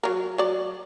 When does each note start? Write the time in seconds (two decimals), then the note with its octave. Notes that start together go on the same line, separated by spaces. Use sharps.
0.03 F#3 A#4
0.38 F#3 D5